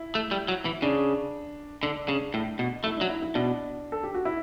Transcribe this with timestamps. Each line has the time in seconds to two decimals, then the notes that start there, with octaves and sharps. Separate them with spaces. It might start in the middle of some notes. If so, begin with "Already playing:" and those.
Already playing: E4
0.15 A3
0.31 G3
0.48 F#3
0.65 E3
0.82 C#3 D4
1.83 D3 D4
2.08 C#3
2.34 A2
2.59 B2
2.84 A3 E4
2.97 F#3 D4
3.09 E4
3.22 E4
3.35 B2 D4
3.92 A4
4.03 G4
4.14 F#4
4.25 E4